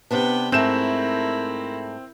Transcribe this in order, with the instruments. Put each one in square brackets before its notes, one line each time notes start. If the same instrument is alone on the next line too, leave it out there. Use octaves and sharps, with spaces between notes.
[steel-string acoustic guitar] C3 B3 D4 [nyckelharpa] B4 G5
[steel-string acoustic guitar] G#2 A3 [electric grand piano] C4 G6 E7 [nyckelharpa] E4 A#4